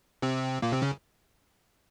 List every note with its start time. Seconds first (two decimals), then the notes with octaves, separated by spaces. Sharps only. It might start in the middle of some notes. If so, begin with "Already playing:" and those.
0.22 C3 C4
0.62 A#2 A#3
0.72 C3 C4
0.82 C#3 C#4